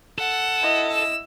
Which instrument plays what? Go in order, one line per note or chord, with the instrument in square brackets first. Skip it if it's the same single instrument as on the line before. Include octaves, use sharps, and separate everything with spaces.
[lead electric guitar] A4 [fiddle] F#5
[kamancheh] E4 D#5
[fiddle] E6